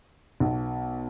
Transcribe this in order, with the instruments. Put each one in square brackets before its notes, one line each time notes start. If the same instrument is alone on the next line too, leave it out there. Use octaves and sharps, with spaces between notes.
[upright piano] B1 B2